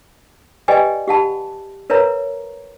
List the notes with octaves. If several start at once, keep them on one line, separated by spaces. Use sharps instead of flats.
G4 B4 D5 D#5 G5 G#5
G4 F#5 A5 B5
A#4 B4 C#5 E5 A#5